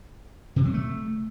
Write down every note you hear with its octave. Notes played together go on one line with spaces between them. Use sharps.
C3
F#3
A3